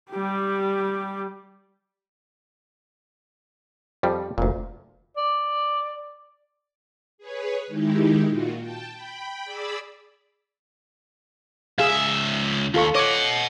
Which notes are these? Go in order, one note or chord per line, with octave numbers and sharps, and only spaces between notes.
G3 G4
F2 F3 G3
F1 D2 A#2
D5
G#4 B4 C#5
D#3 G#3 D#4 E4 G4
A#2 F4 F#4
G5 A5
G5 B5
G#4 D5 B5 D6 E6
C#2 G#4 E5 F5
D#2 F4 A4 C#6
C#5 D#5 F#5 D6